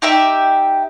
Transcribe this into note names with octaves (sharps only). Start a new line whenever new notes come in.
D#4 G4 E5 G5